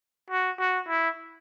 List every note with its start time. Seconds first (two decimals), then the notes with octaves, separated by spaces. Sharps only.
0.30 F#4
0.60 F#4
0.88 E4